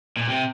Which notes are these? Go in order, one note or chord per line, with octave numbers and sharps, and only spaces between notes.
A#2
C3